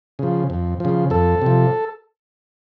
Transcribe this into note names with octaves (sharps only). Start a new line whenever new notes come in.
C#3 F3
F2
C#3 F3
F2 A4
C3 F3